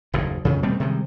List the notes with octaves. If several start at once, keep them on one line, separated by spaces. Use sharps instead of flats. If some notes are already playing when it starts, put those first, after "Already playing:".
F#1 D#2 A2
F2 C#3
B2 G3 A3 C4
C3 D#3 G3 G#3